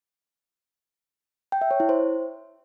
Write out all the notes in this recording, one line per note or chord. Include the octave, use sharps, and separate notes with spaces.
G5
E5
C#5
E4
C5